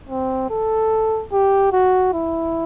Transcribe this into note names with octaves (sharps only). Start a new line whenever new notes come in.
C4
A4
G4
F#4
E4